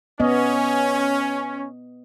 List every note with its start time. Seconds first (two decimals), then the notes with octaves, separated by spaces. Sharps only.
0.20 B3 C#4 D#5